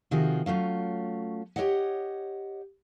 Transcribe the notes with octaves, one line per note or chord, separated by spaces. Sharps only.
C3 D#3 F3 F#4 G#4 D#5
F#3 A3 C#4 F4
G4 A4 C#5 D#5 F#5